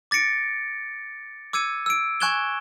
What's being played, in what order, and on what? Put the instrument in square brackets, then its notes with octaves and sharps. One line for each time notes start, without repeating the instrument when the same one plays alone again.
[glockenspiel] D6 A6 A#6 C#7 D7
D6 E6 G#6 C#7 D#7
E6 D7
G#5 C#6 F#6 G#6 E7 G7